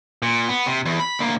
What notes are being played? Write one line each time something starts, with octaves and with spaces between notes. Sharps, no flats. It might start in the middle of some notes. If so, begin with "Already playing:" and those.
A#2
B3
C3
E2
B5
D2 A#3